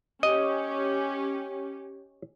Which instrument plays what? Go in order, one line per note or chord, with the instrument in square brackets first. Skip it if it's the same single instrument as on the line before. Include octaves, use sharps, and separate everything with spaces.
[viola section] C#4 G4 [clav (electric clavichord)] D#5